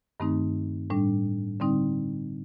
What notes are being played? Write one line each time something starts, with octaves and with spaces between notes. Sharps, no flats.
G2 D#3 A3 C4 D#4
A2 G3 D4
D3 G3 C4 D#4